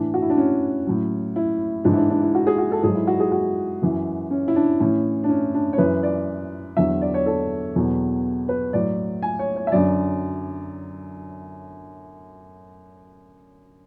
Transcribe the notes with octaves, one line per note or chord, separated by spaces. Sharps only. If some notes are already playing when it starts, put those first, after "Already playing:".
Already playing: A2 E3 D4
F#4
E4
D4
C#4
A2 F#3
E4
G#2 E3 D4
E4
D4
D4
E4
F#4
G#4
F#4
A4
G#2 F#3 G#4
E4
F#4
G#4
F#4
F#2 E3
C#4
E4
D4
A2 E3 C#4
D4
C#4
D4
C#5
F#2 E3 B4
D5
E2 D3 F#3 E5
D5
C#5
A4
E2 B2 F#3
B4
A2 F#3 D5
G#5
C#5
C#5
E5
F#2 D3 F#3 D5